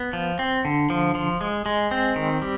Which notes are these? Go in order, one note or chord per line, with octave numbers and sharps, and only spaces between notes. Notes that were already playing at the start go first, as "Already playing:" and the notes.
Already playing: B3
F3
C4
D3
F3
F3
G#3
G#3
C4
D#3
G3